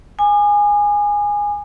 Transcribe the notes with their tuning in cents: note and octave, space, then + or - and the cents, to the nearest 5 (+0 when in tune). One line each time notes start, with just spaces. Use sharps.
G#5 -10 D6 +45